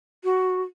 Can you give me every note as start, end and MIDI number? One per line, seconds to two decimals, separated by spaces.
0.24 0.62 66